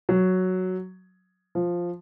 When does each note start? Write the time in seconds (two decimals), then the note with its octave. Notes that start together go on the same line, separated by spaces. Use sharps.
0.09 F#3
1.55 F3